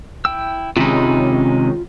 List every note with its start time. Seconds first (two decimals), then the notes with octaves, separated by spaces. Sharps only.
0.25 E4 G5 E6
0.77 C3 D#3 G#3 C#4 D#4 F4 B5